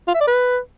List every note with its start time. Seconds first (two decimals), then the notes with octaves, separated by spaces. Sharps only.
0.08 F4
0.14 E5
0.21 D5
0.27 B4